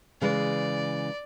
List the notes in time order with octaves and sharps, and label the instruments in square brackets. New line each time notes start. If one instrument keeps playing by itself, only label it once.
[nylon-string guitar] C#3 E3 G#3 [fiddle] D5